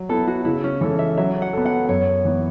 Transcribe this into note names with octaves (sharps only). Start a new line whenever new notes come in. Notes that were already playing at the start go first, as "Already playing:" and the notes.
Already playing: F#3
B3 E4 A4
F#4
C#3 E4
C#4
E3 C#4 A4 C#5
E5
F#3 E5
F#5
B3 A4
F#5
F#2 C#5
E3 B3